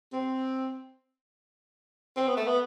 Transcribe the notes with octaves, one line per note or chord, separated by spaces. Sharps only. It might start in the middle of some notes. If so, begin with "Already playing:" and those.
C4
C4
B3
A3
B3